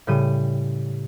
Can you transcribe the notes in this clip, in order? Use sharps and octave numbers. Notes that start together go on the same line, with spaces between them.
A2 C#3 G3 G6 D#7